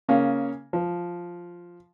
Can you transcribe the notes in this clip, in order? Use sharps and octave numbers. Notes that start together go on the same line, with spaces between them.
C#3 A#3 C#4
F3